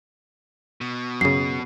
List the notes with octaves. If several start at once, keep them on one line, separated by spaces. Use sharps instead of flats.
B2
F#2 C#3 C7